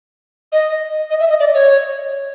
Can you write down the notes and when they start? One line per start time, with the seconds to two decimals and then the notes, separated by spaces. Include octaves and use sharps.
0.52 D#5
1.10 D#5
1.20 E5
1.29 D#5
1.40 D5
1.54 C#5